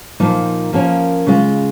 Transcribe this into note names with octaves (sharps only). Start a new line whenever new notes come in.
A#2 F3 A#3 D#4
F3 A#3 C#4 A#4
C#3 G#3 F4